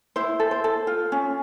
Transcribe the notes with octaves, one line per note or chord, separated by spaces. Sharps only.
E4 C5
A4
C5
A4
F4
C#4